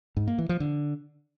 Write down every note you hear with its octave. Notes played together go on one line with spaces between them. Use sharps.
G#2
A#3
E3
F3
D3